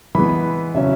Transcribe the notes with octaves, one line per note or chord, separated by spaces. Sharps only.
E3 G#3 B3 B5
C#3 F#3 C#4 E5